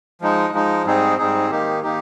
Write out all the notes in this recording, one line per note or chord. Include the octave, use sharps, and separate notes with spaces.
F3 G#3 D#4
F3 G#3 D#4
G#2 G3 C4 D#4 G#4
G#2 G3 C4 D#4 G#4
D#3 A#3 D#4 G4
D#3 A#3 D#4 G4